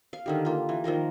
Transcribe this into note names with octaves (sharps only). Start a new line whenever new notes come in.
F5
D3 D#3 G4
A#3 F4
E3
D#3 F3 A#3 A#4